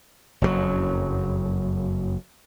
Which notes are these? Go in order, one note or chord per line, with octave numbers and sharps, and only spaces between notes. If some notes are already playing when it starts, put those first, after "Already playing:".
F#1 F2 B2 F#3